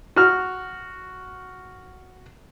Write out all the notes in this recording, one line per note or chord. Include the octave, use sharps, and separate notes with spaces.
F#4 F6